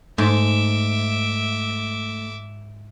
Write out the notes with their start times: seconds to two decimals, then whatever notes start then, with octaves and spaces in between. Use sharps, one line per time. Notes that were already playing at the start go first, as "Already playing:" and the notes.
0.18 G#2 A3 E5 D6